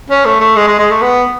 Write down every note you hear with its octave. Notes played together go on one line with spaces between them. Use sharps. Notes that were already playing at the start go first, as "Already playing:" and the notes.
C#4
A3
A3
G#3
G#3
G#3
A3
B3